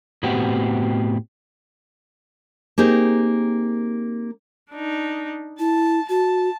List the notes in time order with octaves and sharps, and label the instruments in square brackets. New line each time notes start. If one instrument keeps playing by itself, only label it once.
[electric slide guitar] A2 B3 C4 F#4 G4
[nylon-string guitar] A#3 C4 D#4 G4 G#4
[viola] D4 D#4
[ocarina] E4 [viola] A5
[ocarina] F#4 [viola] A5